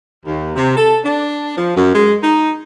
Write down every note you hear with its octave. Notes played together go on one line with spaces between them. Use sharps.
D#2
C3
A4
D4
F3
F#2
G#3
D#4